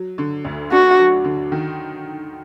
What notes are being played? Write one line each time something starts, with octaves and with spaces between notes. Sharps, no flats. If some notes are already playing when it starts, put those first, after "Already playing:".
Already playing: F#3
D3
D2
D4 F#4
F#3
D3
D#3